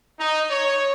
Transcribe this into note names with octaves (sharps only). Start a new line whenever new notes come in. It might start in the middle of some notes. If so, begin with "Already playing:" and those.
D#4
C#5